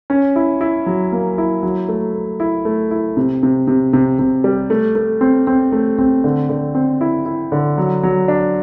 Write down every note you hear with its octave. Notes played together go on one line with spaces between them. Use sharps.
C#4
E4
E4
F#3
A#3
E4
F#3
A3
A3
E4
A3
E4
C3
C3
C3
C3
C3
G3
A3
A3
C4
C4
A3
C4
D3
D3
C4
E4
E4
D3
F#3
F#3
D4